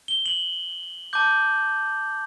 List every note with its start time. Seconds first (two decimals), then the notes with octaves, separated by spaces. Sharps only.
0.08 G7
0.26 F#7
1.13 A5 D6 G6